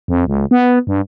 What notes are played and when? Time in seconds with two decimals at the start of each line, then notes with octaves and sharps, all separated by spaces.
0.08 F2
0.27 C#2
0.51 B3
0.87 G2